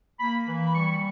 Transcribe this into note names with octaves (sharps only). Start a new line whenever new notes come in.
A#3 B5
E3
B5
G3 C#6